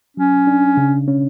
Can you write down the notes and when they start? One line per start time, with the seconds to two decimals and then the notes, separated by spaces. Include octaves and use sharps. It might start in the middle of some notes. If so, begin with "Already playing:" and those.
0.17 F#3 C#4
0.47 D4
0.77 C#3
1.08 C#4